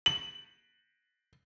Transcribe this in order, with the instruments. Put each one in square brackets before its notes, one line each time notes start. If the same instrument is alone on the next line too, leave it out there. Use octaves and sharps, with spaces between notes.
[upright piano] F#7